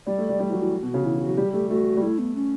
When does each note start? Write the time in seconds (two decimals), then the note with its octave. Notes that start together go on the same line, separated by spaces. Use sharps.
0.07 G3 D5
0.18 A3
0.29 G3
0.39 G3
0.49 F#3 E4
0.56 F#4
0.61 E3
0.83 B2
0.94 C#3
1.04 E3 E4
1.15 E3
1.21 F#4
1.26 F#3
1.37 G3 G4
1.53 A3 G4
1.69 A3 F#4
1.97 G3
2.02 A3 E4
2.19 B3
2.35 C#4